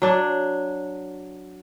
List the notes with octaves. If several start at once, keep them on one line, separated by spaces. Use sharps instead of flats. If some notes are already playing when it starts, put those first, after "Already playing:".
F#3 D4